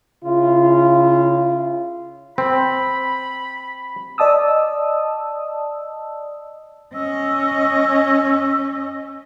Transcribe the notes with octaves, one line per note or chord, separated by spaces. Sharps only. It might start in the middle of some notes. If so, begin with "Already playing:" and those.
C#3 E4 F4
C4 B5
D5 D#5 A5 D#6 E6
C#4 D#5 E6